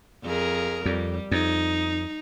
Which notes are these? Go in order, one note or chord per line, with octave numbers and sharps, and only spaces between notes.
F2 G#4 A#4
F2 G3
F2 D#4